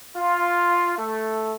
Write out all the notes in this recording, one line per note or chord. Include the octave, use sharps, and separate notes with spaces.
F4
A3